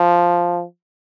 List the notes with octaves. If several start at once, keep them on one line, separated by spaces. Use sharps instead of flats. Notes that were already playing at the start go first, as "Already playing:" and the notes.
Already playing: F3